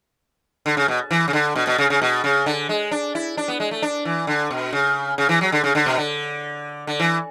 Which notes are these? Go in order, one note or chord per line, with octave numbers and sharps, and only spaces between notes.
D3
C#3
B2
E3
C#3
D3
B2
B2
C#3
C#3
B2
C#3
D3
G#3
D4
E4
D4
B3
G#3
A3
D4
E3
D3
B2
C#3
C#3
E3
F#3
D3
C#3
D3
B2
D3
D3
E3